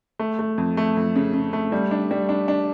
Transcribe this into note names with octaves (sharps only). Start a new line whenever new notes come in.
A3
A3
F2
A3
F2
C#3
C#3
A3
G3
D4
G3
D4
D4